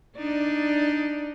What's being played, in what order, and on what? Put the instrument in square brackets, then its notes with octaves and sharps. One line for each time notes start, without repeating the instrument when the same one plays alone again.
[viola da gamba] D4 D#4 D5